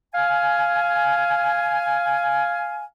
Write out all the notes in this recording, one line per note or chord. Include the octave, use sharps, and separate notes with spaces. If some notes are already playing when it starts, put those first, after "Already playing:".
F5 G#5